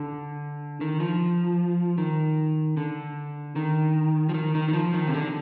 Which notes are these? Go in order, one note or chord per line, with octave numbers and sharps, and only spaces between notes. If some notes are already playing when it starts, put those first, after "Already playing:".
Already playing: D3
D#3
F3
D#3
D3
D#3
F3
D#3
D#3
D#3
F3
D#3
C3
D3